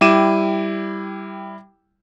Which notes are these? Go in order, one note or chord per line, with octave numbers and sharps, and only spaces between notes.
G3 E4 G5 D6 D#7 E7